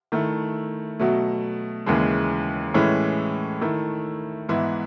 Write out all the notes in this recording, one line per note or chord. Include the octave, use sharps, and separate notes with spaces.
D#3 A3 E4
B2 F#3 A3
D#2 C#3 E3 G#3
A2 E3 G#3 C#4 E4
D#3 A3 E4
G#2 E3 B3 E4